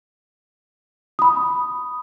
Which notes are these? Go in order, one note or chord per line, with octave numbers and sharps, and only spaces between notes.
B5 D#6